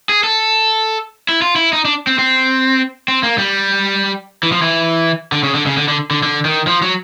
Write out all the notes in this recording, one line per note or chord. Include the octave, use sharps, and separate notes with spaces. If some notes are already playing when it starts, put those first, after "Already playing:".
G#4
A4
E4
F4
E4
D#4
D4
C4
C4
C4
A#3
G3
E3
F3
E3
D3
C#3
D3
C#3
D3
D3
D3
D3
D#3
F3
F#3